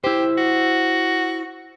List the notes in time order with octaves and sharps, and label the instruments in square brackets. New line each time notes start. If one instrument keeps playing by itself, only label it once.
[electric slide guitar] E4 C5 [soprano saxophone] G4
[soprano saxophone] F#4